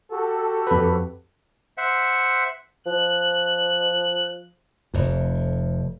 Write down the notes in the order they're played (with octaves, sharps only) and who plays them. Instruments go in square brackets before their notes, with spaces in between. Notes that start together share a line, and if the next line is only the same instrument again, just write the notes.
[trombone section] F#4 G4 A4
[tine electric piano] F2 B4
[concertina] C5 E5 F#5
[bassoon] F3 [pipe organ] F#6
[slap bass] F1 F2